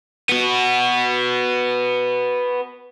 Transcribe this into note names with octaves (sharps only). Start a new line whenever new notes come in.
B3 F#4